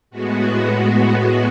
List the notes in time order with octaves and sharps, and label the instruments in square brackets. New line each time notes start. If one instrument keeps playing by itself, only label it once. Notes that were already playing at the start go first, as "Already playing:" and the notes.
[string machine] A2 G#3 B3 F#4